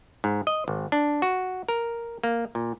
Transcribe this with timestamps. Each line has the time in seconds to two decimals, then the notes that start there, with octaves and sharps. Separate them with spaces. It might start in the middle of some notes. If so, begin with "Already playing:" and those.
0.24 G#2
0.47 D#5
0.68 G#1
0.92 D4
1.22 F#4
1.69 A#4
2.24 A#3
2.55 A#2